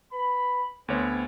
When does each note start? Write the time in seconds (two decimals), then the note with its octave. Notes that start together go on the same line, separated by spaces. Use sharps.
0.12 B4 B5
0.88 D2 B3 C4 C#5